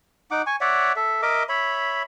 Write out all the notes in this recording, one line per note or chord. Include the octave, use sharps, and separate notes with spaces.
D#4 F#5 D6
G#5 C#6
C#5 D5 E5 F#5
A4 E5
A#4 D#5 E5 D6
C#5 E5 B5